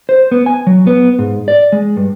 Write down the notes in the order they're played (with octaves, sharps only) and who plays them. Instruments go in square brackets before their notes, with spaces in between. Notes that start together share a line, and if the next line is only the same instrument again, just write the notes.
[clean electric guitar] C5
B3
G#5
F#3
B3
G#2
D5
G#3
G2